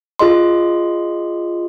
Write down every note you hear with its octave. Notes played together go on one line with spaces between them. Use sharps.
F4 G#4 D#5 C6